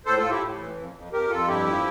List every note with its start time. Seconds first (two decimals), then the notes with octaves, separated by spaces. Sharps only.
0.06 A2 A4 C5
0.17 F4 A4
0.24 A2
0.30 E4 G4
0.41 A2
0.59 E3
0.77 F2
0.95 F2
1.12 F2 G4 A#4
1.30 F2 F4 A4
1.47 G2 E4 G4
1.66 F3